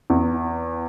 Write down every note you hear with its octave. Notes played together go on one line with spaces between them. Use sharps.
E2